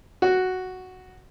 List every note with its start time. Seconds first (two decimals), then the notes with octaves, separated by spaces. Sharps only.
0.22 F#4